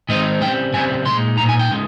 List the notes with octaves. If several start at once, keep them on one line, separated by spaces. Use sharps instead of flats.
D#3 G#3 C4 D#4 D#5
C#3 G3 C4 G5
C#3 G3 C4 G#5
A#2 G#3 D#4 C6
A#2 G#3 D#4 A#5
G#5
G5
C#3 G#3 D#4